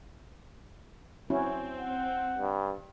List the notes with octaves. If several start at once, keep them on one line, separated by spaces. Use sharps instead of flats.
C4 C#4 E4 F#4
F#5
G2